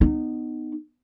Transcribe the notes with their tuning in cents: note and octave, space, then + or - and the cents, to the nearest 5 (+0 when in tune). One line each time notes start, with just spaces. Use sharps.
B3 +15 D#4 -20